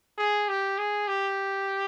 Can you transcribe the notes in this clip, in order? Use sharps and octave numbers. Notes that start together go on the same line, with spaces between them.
G#4
G4
G#4
G4